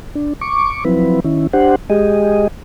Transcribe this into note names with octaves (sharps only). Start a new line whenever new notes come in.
D4
C#6 D6
F3 F#3 C4 E4 B4
D#3 C#4 E4
D4 G4 C5 F#5
G#3 G4 G#4 D#5